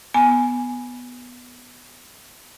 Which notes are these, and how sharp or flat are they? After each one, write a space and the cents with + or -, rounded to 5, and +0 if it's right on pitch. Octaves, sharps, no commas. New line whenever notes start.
B3 +0 G#5 +0